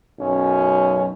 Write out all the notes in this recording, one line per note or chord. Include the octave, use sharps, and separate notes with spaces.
B1 F#2 C#4